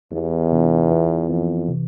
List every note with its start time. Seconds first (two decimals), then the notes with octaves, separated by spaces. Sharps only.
0.12 E2 E3 B3 E4 G4
0.52 C3 E3 B3 D4 F4
0.90 E3 B3 F4 B4 E5
1.29 F2 E3 B3 E4
1.68 C3 E3